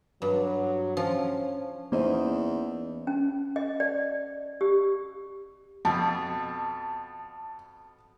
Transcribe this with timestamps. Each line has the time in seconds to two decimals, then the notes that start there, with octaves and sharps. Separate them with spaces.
0.22 G2 F#3
0.97 F3 C#4
1.92 E2 A#3 C#4 D#4 C5 D#5
3.07 C#4
3.56 D#5
3.80 D5
4.61 G4
5.85 F2 B2 A5